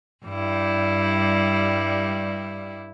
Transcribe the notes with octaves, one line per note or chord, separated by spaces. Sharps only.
G2 G3 E4